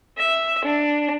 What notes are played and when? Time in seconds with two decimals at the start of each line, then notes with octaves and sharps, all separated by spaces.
0.17 E5
0.65 D4